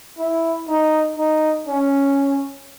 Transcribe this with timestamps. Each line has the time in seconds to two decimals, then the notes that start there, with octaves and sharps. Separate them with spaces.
0.18 E4
0.68 D#4
1.17 D#4
1.67 C#4